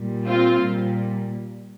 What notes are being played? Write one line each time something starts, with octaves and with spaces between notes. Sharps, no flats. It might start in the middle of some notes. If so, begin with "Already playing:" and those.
Already playing: A#2 G3
C4 F4
A#2 G3